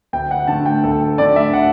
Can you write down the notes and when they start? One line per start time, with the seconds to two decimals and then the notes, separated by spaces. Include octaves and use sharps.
0.13 D2 G5
0.31 F#5
0.47 D3 A3 A5
0.66 G5
0.84 D2 A4
1.18 D3 A3 D5
1.36 E5
1.53 F#5